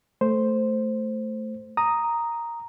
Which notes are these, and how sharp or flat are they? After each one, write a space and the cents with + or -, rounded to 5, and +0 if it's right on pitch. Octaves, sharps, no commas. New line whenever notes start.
A3 +0 C5 +0
A#5 +0 D#6 +0